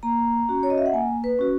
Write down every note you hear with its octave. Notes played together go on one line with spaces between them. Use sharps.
A#3 A#5
C#4 F#4
C#5
D#5
E5
F#5
A#3 G#5
B4
C#4 F#4